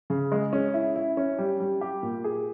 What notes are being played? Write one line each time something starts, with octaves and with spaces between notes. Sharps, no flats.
C#3
G#3
C#4
E4
E4
C#4
G3
G3
G4
A#2
G#4